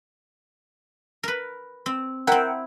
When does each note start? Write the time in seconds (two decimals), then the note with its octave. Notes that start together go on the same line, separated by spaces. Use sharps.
1.23 A#4 B4
1.86 C4
2.27 C4 E4 A#4 F#5 G5